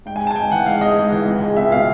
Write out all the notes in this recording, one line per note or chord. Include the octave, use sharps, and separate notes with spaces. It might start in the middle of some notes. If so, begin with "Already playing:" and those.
G#2 G5
G#5
G#3
A5
G#5
G#2 G5
E3 F#5
G#2 F5
G#3 D#5
G#2
E3
C#2
G#3
C#2 E5
B2 F5